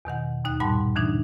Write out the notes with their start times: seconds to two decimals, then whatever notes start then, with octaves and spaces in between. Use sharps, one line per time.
0.05 E2 B2 D#3 F#5
0.45 D#2 D#4 F#6
0.60 G2 A#2 G3 F#5 A5 C6
0.96 D3 E3 D4 D#4